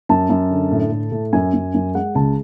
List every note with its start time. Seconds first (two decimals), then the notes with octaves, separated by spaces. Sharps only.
0.09 F#2 A5
0.30 F#2
0.50 D3
0.71 A2
0.92 A2
1.12 A2
1.33 F#2 G#5
1.54 F#2
1.74 F#2
1.95 G#3 F#5
2.15 C#2 A5